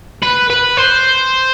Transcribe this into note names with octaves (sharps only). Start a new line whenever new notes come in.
B4
B4
C5